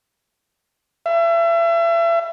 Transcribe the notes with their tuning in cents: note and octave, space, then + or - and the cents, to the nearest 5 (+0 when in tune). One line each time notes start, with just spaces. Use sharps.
E5 +35